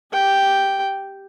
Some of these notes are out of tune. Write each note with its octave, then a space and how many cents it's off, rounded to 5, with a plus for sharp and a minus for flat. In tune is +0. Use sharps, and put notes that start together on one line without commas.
G4 +0 G5 +0